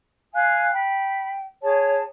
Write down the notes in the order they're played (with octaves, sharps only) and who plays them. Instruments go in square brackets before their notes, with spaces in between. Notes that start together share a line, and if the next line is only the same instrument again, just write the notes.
[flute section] F5 G#5 F#6
[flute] G5 [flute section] B5
[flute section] G#4 A5 [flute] C#5